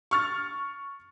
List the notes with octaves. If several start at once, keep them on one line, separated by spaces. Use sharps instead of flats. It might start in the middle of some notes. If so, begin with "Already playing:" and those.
C#6 F6 A6